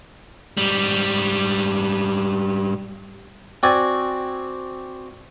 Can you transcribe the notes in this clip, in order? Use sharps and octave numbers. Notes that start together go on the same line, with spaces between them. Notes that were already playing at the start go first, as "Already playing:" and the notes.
G#2 G3
C4 F#4 D5 G#5